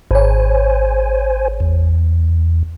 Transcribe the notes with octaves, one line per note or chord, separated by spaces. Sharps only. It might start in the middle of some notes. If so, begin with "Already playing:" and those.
G#1 C5 C#5 G#5
E2